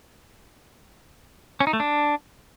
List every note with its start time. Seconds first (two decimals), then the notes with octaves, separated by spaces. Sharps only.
1.60 C#4
1.67 D#4
1.73 A3
1.80 D4